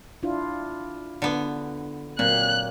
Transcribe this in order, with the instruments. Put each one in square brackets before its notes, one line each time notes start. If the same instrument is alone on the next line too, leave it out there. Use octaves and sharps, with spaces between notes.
[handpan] D4 E4 F4
[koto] D3 B3
[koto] A#2 [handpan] F#3 A#3 C4 [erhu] F#6